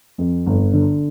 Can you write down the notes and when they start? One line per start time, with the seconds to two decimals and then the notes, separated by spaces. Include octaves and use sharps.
0.18 F2
0.46 G1
0.73 D3